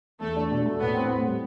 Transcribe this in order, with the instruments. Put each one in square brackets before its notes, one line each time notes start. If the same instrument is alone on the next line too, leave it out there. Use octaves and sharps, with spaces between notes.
[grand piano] E2 [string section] A3 A4
[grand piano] D4
B2
A3
[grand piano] A2 [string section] B3 B4
[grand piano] C4
A2
G3